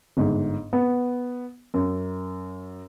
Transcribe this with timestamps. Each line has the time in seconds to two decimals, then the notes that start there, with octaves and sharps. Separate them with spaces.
0.17 G1 G#2
0.73 B3
1.74 F#2